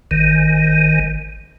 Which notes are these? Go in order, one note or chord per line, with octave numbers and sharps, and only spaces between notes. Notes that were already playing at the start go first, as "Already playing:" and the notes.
G#1 D#3